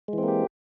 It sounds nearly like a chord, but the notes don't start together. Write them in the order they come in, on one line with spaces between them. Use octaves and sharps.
G#3 E3 C4 A#3 G4